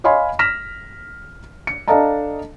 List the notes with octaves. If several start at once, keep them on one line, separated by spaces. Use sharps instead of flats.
C#5 D#5 F5 G#5 B5 C6
F6 A#6 B6 E7
C#7
D4 A4 D#5 F5 A5 A#5